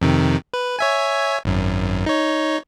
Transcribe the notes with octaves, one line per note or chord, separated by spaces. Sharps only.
F2 C3 D#3
B4
C#5 E5 G#5
G#1 F#2
D#4 C#5